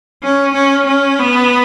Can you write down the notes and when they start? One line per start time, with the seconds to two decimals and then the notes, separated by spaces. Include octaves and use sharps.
0.23 C#4
0.55 C#4
0.86 C#4
1.19 B3